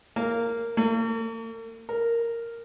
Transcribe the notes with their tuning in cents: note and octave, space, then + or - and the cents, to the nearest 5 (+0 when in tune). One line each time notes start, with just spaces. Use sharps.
A#3 -10
A#3 -45
A#4 -5